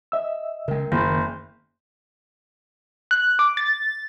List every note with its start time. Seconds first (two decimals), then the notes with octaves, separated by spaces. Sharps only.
0.12 D#5 E5 E6
0.68 C#3 G#3 A#4 G5
0.92 F#1 D#3 A#3 B5 C6 G6
3.11 F#6
3.39 D6
3.57 A6